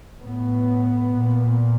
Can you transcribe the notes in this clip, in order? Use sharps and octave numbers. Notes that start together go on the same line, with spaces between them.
A2 B3
A#2